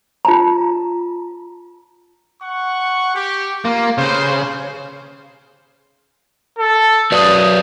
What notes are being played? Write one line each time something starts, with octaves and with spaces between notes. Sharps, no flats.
F4 A5 A#5
F#5 C#6
G4
A#3 F4
C#3 G4 B4 C5
A4
F#3 B4 D5 D#6